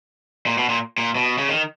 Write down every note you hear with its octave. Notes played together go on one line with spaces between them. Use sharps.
A#2
B2
A#2
A#2
B2
C#3
D#3